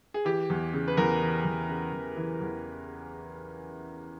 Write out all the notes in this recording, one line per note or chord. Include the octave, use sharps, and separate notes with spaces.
G#4
E3 G4
E2
C#3
B4
E2 A#4
E3
E2
C#3
E2
E3
E2